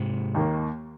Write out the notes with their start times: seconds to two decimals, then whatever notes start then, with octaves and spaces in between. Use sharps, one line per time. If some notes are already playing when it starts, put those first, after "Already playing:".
Already playing: G#2 C3
0.34 D#2 D#3 A#3